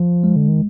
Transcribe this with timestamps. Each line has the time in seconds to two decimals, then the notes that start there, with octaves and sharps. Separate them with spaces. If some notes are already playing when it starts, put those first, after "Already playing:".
Already playing: F3
0.24 G#3
0.36 D3
0.49 D#3